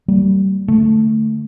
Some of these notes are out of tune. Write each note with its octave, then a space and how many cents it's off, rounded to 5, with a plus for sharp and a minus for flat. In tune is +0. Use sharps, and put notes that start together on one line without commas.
G3 -20 A#3 -40
D3 +0 A3 +0